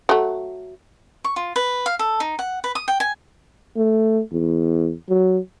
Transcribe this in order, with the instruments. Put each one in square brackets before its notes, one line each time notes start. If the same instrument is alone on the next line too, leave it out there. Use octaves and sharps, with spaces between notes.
[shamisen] F#3 A3
[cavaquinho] C#6
F4
B4
F5
A4
D#4
F#5
B4
D#6
G5
G#5
[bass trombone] A3
E2
F#3